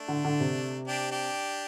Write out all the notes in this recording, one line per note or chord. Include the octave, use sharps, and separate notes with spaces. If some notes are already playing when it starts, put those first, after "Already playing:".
Already playing: A3 D4
D3
D3
C3
D4 G4
D4 G4